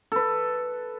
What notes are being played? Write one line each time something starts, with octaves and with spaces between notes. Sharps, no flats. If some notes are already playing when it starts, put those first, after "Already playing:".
A4 B4